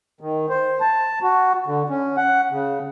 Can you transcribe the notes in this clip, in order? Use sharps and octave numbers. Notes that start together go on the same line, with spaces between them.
D#3
C5
A5
F#4
D3
C#4
F#5
C#3